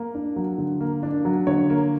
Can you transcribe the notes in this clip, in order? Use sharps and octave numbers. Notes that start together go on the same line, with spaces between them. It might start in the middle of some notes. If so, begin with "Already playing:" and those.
Already playing: A#3
D4
F#3
D3
A#3
D4
F#3
D3 C#5
A#3